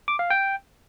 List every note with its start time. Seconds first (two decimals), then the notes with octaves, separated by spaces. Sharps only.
0.08 D6
0.19 F5
0.30 G5